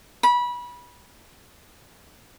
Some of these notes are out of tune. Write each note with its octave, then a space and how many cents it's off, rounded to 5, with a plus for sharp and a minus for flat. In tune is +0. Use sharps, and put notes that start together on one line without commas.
B5 -25